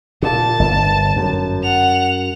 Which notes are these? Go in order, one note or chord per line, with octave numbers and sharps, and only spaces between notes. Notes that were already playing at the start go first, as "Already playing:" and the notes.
A#2 A5
G1
F#2
F#5 F7